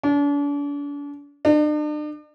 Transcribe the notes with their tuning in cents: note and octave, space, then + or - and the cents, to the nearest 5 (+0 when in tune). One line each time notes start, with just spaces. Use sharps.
D4 -40
D4 +40